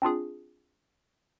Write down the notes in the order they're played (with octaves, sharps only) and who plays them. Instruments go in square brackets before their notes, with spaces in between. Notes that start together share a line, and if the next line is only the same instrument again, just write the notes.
[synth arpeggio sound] C4 D4 F4 G#4